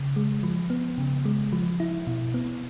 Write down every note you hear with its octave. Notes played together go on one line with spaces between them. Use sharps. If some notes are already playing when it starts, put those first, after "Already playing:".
Already playing: C#3
G#3
F3
B3
C#3
G#3
F3
E4
B2
B3